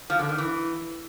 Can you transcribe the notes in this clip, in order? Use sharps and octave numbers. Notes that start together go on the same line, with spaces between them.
F3
D3
D#3
E3